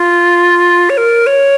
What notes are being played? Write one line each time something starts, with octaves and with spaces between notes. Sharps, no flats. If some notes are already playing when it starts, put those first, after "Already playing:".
Already playing: F4
C#5
A#4
C#5